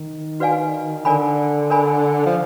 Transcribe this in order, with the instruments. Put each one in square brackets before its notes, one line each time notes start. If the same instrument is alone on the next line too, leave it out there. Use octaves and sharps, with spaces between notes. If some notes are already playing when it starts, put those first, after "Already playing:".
Already playing: [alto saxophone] D#3
[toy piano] F#4 B4 D5 F5 G#5
[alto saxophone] D3 [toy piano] A#4 D5 G#5 B5
[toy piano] A#4 D5 G#5 B5
[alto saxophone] F3